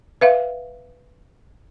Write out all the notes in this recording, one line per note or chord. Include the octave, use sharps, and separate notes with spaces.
B4 E5 F5